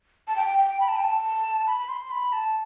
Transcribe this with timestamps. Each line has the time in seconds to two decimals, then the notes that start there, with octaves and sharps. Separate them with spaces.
0.28 A5
0.36 G5
0.58 G5
0.80 B5
0.88 A5
0.96 G5
1.04 A5
1.67 B5
1.80 B5
1.89 C6
2.11 B5
2.33 A5